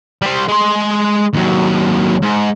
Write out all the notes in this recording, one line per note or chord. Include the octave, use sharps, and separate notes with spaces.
G3 C5
G#3 C6
D#2 F#3
G#2